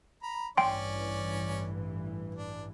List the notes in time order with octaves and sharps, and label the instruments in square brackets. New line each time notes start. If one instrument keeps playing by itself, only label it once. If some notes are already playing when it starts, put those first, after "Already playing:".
[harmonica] A#5 B5
[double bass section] A1 G2 E3 [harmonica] C#4 D5 [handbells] G5 C6
[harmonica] D4